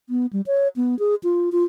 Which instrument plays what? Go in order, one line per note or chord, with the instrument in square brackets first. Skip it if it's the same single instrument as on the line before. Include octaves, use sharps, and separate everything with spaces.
[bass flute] B3
G3
C#5
B3
G#4
F4
F4